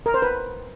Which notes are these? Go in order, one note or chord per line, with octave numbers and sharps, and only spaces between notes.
A#4
C5
B4